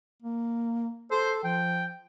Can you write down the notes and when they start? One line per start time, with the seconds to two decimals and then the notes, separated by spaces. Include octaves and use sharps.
0.23 A#3
1.11 A4 C5
1.44 F3 G5